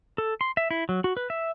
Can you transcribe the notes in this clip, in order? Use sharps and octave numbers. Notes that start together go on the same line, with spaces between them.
A4
C6
E5
E4
F#3
F#4
B4
E5